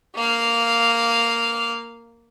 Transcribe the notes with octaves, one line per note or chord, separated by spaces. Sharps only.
A#3 F5